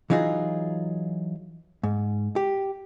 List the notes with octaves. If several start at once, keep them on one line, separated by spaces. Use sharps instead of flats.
E3 F#3 D#4 F4 G#4
G#2
G4